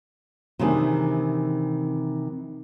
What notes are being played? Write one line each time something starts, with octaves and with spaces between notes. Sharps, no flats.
C3 D#3 E3 A3 D4 G#4